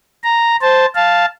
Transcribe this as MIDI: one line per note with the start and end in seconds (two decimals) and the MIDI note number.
0.24 0.56 82
0.62 0.86 72
0.62 0.86 81
0.95 1.25 77
0.95 1.25 81